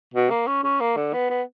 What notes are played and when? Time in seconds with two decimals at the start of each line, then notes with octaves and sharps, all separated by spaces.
0.14 B2
0.30 A#3
0.47 C#4
0.64 C#4
0.80 A#3
0.97 D3
1.13 B3
1.30 B3